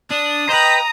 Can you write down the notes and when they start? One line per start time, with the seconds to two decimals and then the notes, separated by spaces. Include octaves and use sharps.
0.10 D4 D#6
0.49 B4 C5 D#5 G5 A#5